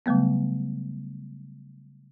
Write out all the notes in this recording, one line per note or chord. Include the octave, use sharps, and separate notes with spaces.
C#3 F#3 G3 A3 B3